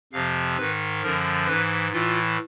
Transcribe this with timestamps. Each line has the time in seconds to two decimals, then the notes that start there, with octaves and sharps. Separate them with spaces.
0.13 F2 C3 F3 F5
0.57 G#2 D#3 B4
1.03 F#2 D3 F3 A#4
1.47 G#2 E3 B4
1.93 A2 E3 F4